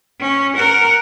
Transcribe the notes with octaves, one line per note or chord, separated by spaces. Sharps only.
C#4
A#4 F#5